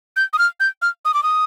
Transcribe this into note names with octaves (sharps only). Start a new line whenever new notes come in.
G6
D#6
F6
G6
F6
D#6
D6
D#6